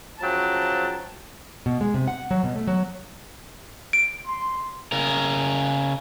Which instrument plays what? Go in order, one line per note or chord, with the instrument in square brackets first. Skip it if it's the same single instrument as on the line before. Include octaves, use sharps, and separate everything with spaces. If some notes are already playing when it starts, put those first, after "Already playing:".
[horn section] C#3 F3 F#3 G5 A5 A#5
[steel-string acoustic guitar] B2
G#3
C3
F#5
F#3
B2
A3
F#3
[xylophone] D7
[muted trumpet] C6
[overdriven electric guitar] C#3 A#4